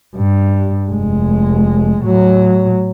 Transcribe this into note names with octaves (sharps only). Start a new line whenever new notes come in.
G2
F1 G#3
A2 F#3